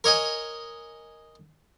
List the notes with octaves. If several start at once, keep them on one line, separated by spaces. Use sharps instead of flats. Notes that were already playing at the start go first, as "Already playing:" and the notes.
A#4 C#5 D#5 G#5